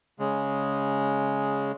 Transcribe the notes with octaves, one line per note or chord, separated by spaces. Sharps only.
C#3 G#3